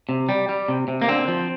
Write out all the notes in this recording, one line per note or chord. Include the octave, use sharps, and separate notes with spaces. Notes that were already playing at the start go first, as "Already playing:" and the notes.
C3
G3
G3
C3
C3
A#3
D3 C4
F3